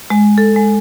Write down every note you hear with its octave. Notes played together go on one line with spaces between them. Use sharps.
G#3
A4
G#3